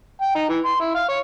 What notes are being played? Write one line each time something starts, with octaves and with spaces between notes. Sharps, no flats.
G5
D#4
E3
C6
E4
F5
C#5